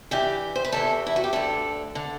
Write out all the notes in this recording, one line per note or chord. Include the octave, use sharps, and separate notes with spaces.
G2 E3 G4
C5
B4
E2 C3 E3 A4
E4
F#4
G4
D2 D3 A4
D3